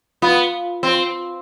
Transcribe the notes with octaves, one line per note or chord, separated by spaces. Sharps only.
B3 F4
C4